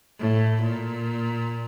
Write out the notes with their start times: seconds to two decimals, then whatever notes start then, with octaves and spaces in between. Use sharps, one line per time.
0.20 A2
0.63 A#2